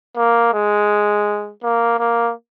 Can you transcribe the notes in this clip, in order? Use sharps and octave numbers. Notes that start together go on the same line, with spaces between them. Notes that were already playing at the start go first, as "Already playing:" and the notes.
A#3
G#3
A#3
A#3